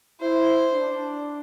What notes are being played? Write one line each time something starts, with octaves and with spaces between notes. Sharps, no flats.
E4 C5
D4